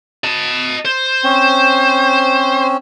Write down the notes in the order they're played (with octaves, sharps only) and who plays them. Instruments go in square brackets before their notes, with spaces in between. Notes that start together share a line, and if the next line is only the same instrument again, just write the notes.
[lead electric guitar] D#5 A5
C5
[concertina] C4 C#4